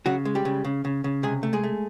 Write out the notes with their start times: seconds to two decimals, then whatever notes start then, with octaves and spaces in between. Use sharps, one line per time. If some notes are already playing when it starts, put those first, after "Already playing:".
0.06 C#3 F#3 F#4
0.25 G#3
0.35 G3 G4
0.45 C#3
0.65 C#3
0.85 C#3
1.04 C#3
1.23 C3 G#3 G#4
1.43 A3
1.53 G#3 G#4
1.64 A3